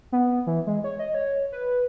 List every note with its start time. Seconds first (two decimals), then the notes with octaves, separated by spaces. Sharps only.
0.12 B3
0.47 E3
0.67 G#3
0.84 C#5
0.99 D#5
1.15 C#5
1.52 B4